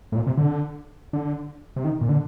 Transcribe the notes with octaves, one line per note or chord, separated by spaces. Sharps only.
A2
A#2
C3
D3
D3
C3
D#3
A#2
D3